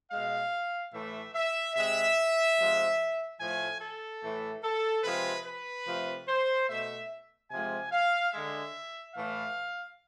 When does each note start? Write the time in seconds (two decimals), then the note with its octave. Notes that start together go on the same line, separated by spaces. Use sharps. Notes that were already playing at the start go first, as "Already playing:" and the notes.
0.11 B2 G#3 F5
0.93 A2 E3 A3 E5
1.35 E5
1.75 C3 G#3 E5
2.58 C3 F3 G#3
3.40 A2 F3 A3 G#5
3.81 A4
4.22 A2 E3 A3
4.63 A4
5.04 C3 F3 G#3 B4
5.46 B4
5.87 C3 F3 A3
6.28 C5
6.69 B2 A3 E5
7.51 C3 F3 G#3 G#5
7.92 F5
8.33 D3 G#3 E5
9.15 A2 E3 A3 F5